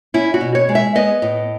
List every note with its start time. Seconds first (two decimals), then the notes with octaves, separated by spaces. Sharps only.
0.14 C#4 E4
0.34 F#4
0.41 B2
0.55 C#5
0.69 G#3
0.75 E5
0.95 B3 D#5
1.22 A2